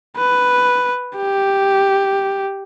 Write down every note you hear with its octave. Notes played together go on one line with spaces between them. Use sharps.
B4
G4